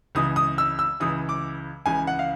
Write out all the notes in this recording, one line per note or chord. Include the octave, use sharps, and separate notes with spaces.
C#2 C#3 E3 D#6
D#6
E6
E6
C#2 C#3 E3 D#6
D6
C#2 C#3 E3 G#5
F#5
F5